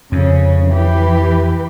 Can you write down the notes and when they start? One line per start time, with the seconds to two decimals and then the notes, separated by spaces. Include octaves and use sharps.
0.12 F2 C#3 C#4
0.67 E3 G4 B4